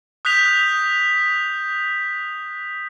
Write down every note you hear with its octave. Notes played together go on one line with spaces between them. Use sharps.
D#6 F#6 G6 B6 F7